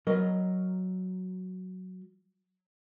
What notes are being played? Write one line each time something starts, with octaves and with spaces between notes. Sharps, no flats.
F#3 A#4 D#5